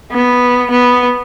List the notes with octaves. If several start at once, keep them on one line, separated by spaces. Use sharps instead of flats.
B3
B3